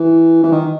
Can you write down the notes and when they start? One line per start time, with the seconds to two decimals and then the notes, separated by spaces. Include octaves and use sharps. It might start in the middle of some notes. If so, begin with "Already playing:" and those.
Already playing: E3
0.43 E3
0.52 D#3